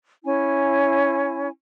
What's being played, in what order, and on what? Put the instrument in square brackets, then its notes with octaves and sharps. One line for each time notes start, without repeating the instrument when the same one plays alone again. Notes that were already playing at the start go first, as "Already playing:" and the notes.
[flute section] C#4 E4 G#5